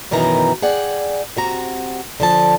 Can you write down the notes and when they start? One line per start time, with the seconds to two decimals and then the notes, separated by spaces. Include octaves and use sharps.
0.11 F#2 B2 D#3 E3 A#5
0.62 G#4 D5 F#5 G5
1.37 C3 F#4 A#5
2.20 D3 F3 A5